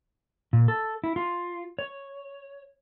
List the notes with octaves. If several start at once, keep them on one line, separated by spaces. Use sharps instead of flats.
A#2
A4
E4
F4
C#5